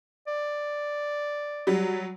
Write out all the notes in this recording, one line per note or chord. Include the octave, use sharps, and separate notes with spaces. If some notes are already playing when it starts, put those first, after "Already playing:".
D5
F#3 G3